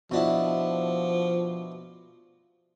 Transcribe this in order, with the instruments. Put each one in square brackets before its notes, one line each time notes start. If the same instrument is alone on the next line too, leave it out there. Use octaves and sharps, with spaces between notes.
[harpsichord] B2 D4 E4 [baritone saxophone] F3